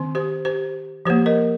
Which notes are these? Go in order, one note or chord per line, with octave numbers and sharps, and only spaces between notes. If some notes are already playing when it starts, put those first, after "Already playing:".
Already playing: D#3 C4
G4 C5
G4 C5
F3 A#3 G4 C5
A#4 D#5